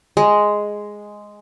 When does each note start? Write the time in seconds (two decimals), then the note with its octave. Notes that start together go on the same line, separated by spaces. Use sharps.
0.17 G#3